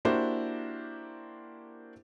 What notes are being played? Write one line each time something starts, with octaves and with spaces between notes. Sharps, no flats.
A#3 D4 E4 F#4 G4 C5